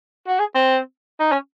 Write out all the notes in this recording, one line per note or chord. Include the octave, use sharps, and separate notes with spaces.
F#4
G#4
C4
D#4
C#4